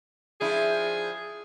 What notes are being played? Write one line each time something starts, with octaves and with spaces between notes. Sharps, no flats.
F3 D4 E4 G#4